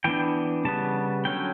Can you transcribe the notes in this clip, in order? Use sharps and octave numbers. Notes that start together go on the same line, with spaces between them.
E3 B3 D4 G5
C#3 G3 B3 A5
D3 F#3 C#4 G5